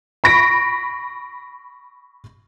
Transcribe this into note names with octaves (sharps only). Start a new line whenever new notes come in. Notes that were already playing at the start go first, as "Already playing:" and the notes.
B5 C#6 A#6 B6 D7